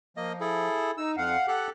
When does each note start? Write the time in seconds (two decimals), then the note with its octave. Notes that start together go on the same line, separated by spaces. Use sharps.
0.17 F3 A#3 D#5
0.40 E4 G#4 A4
0.98 D#4 E6
1.17 F2 F5 F#5
1.48 G4 A4 F#5 F#6